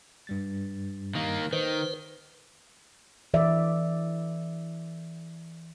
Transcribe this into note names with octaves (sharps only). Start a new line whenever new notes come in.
G2 G3 A6
D#3 A#3
D#3 B4 C5
E3 D5 E5